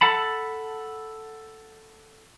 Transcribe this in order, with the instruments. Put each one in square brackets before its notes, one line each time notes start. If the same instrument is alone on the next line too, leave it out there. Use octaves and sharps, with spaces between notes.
[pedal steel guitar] A4 F#5 A5 B5